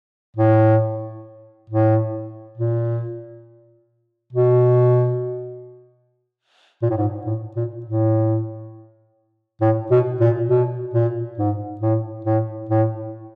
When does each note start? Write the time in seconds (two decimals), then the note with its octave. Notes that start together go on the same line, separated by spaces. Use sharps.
0.37 A2
1.70 A2
2.58 A#2
4.33 B2
6.82 A#2
6.90 A2
6.97 G#2
7.26 A2
7.56 A#2
7.86 A2
9.61 A2
9.91 B2
10.21 A#2
10.49 B2
10.94 A#2
11.38 G#2
11.81 A2
12.25 A2
12.69 A2